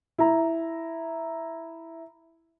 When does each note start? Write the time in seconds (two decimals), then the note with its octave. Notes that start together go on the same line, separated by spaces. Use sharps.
0.18 E4 A#5